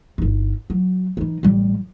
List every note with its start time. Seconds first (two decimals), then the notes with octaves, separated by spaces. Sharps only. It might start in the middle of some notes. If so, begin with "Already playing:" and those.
0.18 G1 D#4
0.70 F#3
1.17 E3 D#4
1.43 A1 G3